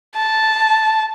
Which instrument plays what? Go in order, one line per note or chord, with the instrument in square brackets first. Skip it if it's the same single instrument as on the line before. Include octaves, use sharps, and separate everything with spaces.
[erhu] A5